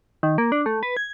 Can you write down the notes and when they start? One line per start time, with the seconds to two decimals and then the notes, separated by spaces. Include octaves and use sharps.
0.23 D#3
0.38 A#3
0.52 D4
0.66 A3
0.83 B4
0.97 G#6